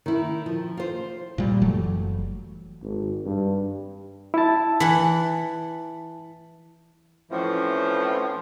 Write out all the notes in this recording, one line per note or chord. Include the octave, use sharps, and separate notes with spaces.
D#3 E4
F3
F4 C5
A#2 G3
F#1 E3 F#3 A3
G#1
G2
E4 A5
E3 F#5
A2 E3 F3 C4 C#4